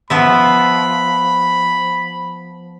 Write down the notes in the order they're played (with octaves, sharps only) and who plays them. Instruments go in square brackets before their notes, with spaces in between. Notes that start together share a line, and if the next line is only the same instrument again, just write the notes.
[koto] F3 B3 E5 [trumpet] B5